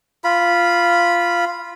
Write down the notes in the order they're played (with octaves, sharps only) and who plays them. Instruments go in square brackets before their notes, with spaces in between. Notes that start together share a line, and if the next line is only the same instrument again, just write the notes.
[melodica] F4 B5